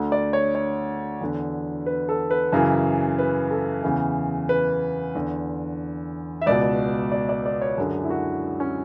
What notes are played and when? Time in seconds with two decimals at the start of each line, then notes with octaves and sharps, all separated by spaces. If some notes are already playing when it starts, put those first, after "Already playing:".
Already playing: D2 D3
0.12 D5
0.33 C#5
0.55 C#5
1.21 E2 D3
1.86 B4
2.09 A4
2.31 B4
2.52 F#2 C#3 E3
3.19 B4
3.51 A4
3.83 E2 C#3 E3
4.49 B4
5.15 E2 D3
6.41 E5
6.46 C#2 B2 D5
7.12 D5
7.29 D5
7.46 D5
7.61 C#5
7.78 F#2 D3 G#4
8.04 E4
8.10 F#4
8.60 C#4